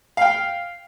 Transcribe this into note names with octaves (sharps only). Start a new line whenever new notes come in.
F5 G5